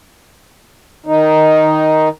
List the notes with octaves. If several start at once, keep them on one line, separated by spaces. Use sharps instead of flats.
D#3 D#4